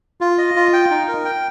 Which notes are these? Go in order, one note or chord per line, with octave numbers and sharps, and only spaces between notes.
F4
D#5
F4
G5
D#4
A#4
G5